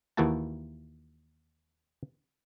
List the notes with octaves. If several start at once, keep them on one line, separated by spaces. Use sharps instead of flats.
D#2 E3 A#3 E4 F#4 A5